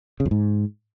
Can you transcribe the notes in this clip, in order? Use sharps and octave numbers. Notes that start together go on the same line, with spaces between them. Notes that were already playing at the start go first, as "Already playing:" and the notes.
C#3
F2
G#2